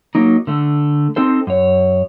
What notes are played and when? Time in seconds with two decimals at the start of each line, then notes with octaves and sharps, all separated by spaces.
0.15 F#3 A#3 D#4
0.47 D3 A3
1.16 C4 D#4 A4 C5
1.47 F#2 C#5